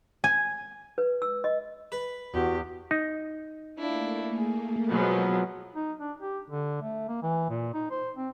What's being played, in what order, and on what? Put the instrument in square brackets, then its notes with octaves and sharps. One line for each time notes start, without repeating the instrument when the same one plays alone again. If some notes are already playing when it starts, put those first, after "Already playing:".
[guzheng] G#5
[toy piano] B4
E6
D#5
[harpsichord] B4
[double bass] E2 [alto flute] F#4 [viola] G4
[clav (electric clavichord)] D#4
[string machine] A3 A#3 [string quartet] D4 E4 F4
[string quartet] G#4
[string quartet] B2 G#3 [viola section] F3 F#3 B3
[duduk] D#4
D4
G4
D3
A3
A#3
E3
A#2
D#4
C5
C4